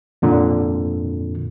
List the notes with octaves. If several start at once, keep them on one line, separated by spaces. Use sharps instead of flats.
F2 A#2 D3